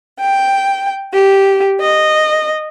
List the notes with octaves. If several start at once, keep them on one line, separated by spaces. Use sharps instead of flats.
G5
G4
D#5